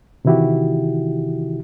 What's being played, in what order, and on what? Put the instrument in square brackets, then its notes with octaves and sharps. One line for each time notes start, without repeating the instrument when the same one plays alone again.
[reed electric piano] C3 D#3 E3 E4 F#4 G4